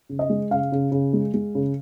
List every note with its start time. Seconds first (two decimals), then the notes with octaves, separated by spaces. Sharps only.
0.09 C#3
0.19 D#5
0.29 G#3
0.51 C#3 F5
0.72 C#3
0.92 C#3
1.13 G#3
1.34 G#3
1.55 C#3